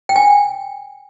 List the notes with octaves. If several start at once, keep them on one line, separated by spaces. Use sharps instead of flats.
G5
G#5